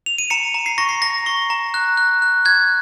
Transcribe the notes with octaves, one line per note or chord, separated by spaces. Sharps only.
F7
D#7
A#5 C#7
A#5
C7
C#6 A#6
C7
A#5 A#6
C#6
A#5
F#6
F#6
F#6
F#6 G#6